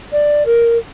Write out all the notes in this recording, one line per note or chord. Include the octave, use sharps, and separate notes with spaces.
D5
A#4